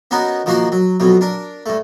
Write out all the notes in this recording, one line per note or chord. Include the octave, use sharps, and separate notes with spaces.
B3 C#4 D#4 F#4 A#4
D#3 F3 A#3 F#4 A#5 C6
F#3
F2 B2 F#3
D4 A#4
G2 A3